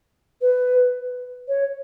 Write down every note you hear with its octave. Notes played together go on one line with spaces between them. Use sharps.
B4
C#5